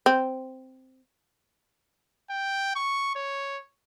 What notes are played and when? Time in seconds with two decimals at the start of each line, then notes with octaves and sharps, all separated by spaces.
0.06 C4
2.30 G5
2.76 C#6
3.16 C#5